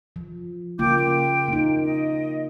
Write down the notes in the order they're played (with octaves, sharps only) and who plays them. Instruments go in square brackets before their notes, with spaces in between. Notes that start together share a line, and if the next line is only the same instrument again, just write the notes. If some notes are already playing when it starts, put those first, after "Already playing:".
[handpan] F3
[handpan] C#3 A#3 F4 [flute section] G5 D6 G6
[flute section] G5
[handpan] A#3 D#4
[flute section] D#5